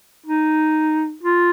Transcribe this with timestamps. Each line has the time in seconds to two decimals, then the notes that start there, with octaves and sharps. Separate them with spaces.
0.26 D#4
1.23 F4